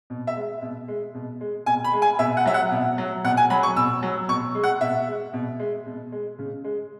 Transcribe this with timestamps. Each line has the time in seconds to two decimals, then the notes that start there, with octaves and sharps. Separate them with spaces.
0.10 B2
0.27 E5
0.36 G#3
0.62 B2
0.88 G#3
1.14 B2
1.41 G#3
1.66 B2 G#5
1.84 B5
1.93 G#3
2.02 G#5
2.19 B2 E5
2.37 F#5
2.45 F#3 E5
2.54 F#5
2.71 B2
2.98 F#3
3.24 B2 F#5
3.37 G#5
3.50 F#3 B5
3.63 C#6
3.76 B2 E6
4.02 F#3
4.29 B2 C#6
4.55 G#3
4.64 F#5
4.81 B2 E5
5.08 G#3
5.33 B2
5.59 G#3
5.86 B2
6.12 G#3
6.39 C#3
6.64 G#3